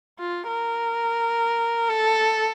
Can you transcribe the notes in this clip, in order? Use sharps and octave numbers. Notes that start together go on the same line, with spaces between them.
F4
A#4
A4